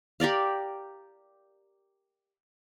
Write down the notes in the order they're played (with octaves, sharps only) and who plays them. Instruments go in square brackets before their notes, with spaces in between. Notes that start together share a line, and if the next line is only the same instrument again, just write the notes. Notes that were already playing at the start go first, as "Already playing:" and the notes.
[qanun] G4 A#4 D5 F5